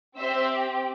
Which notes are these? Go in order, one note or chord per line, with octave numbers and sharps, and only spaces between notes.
C4 G4 C5 E5